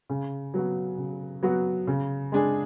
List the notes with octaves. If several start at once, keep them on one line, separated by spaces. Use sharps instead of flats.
C#3
F#3 B3 F#4
C#3
F#3 B3 F#4
C#3
G#3 D4 G#4